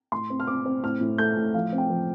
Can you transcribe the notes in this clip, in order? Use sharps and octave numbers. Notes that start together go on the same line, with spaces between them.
A2 C6
C4
F6
C4 D6
C4
A2 F6
A2
A3 G6
A2
F3 F5
C4
G5
F3